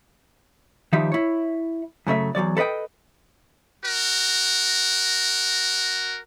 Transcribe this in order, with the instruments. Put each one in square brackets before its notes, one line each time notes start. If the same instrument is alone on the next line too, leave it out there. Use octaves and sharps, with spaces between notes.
[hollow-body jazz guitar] D#3 F3 G3 D#4 E5
E4 C#5
F#2 C#3 A3 E5
E2 G2 F#3 D5
A4 B4 C#5 D#5 G5
[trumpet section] F#4 A#4